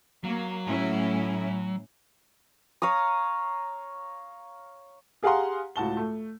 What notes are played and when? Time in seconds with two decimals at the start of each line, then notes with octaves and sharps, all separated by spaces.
0.24 F#3 A#3
0.67 A2 C#4 E4
2.82 C#5 F5 A#5 D#6
5.23 G4 G#4 F5 F#5 A#5 C6
5.76 C#2 A2 F#4 A5 G7
5.97 A3